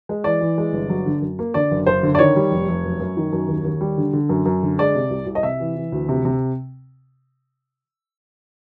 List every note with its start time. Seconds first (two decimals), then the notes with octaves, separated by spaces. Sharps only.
0.09 G#3
0.24 E3 D5
0.41 E3
0.58 G#3
0.73 G1
0.89 F#3
1.06 D3
1.21 F#2
1.39 A#3
1.54 D3 D5
1.71 F#1
1.86 F#1 C5
2.03 D3
2.15 D5
2.19 D#3 C#5
2.36 G3
2.51 F1
2.68 F1
2.84 F#2
3.00 F#2
3.17 D#3
3.32 F#2
3.48 D#2
3.64 D#2
3.81 G3
3.98 D3
4.13 D3
4.29 F#2
4.45 F#2
4.63 D3
4.79 G#3 D5
4.95 C3
5.11 C2
5.26 C2
5.35 D#5
5.43 C3 E5
5.60 E3
5.76 E3
5.92 D2
6.09 C3
6.25 C3